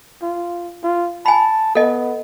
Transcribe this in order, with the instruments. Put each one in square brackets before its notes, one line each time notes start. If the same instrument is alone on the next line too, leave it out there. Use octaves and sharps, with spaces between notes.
[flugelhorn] F4
F4
[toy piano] G#5 B5 [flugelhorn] A5
[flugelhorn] B3 [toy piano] A4 D#5